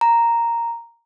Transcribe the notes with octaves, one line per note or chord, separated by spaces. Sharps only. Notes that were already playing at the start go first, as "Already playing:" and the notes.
A#5